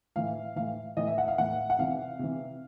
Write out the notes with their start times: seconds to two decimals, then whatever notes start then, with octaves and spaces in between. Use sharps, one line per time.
0.16 A2 E3 F5
0.56 A2 E3 F5
0.97 A2 E3 D#5
1.07 E5
1.18 F#5
1.28 F5
1.38 A2 E3 F#5
1.70 F#5
1.78 C3 E3 F5
2.19 C3 E3